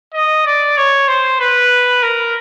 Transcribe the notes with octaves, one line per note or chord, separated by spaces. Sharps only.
D#5
D5
C#5
C5
B4
A#4